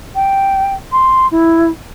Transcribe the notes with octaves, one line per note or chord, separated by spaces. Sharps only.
G5
C6
E4